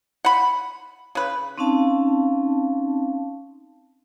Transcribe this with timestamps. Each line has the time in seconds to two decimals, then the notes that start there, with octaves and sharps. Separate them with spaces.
0.25 F#5 B5
1.15 C#3 B4
1.58 C4 C#4 D#4 F5 A5